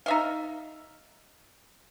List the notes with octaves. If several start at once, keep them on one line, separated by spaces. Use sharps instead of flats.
D#4 E5 F5